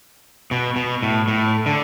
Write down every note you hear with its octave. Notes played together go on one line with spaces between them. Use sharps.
B2
B2
A2
A2
D3